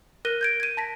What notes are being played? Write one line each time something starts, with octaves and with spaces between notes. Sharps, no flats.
A#4 F#6 A#6 D#7 G7
G6 G#6 D7
G#6 D#7
A5 A#6 B6